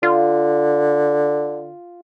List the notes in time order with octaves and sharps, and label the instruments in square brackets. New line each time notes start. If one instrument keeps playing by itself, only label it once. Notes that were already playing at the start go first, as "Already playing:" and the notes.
[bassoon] D3 [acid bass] F4